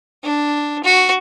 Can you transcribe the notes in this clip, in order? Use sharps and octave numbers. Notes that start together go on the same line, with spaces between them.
D4
F#4